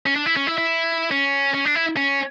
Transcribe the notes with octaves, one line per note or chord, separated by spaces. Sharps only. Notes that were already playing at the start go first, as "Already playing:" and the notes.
C#4
D4
E4
C#4
E4
E4
C#4
C#4
D4
E4
C#4